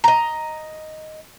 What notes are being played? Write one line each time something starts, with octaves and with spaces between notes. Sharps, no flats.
D#5 A#5